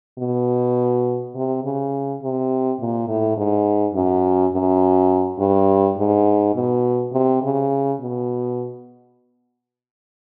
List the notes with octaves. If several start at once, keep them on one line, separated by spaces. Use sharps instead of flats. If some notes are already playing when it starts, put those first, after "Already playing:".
B2
C3
C#3
C3
A#2
A2
G#2
F#2
F#2
G2
G#2
B2
C3
C#3
B2